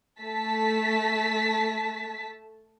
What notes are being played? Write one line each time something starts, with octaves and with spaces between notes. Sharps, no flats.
A3 A5 B6